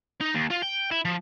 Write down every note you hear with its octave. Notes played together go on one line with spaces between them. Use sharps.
D#4
D#2
F4
G5
E4
F3